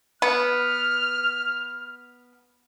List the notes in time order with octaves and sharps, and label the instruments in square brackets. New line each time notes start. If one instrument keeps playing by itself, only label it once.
[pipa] B3 [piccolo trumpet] F6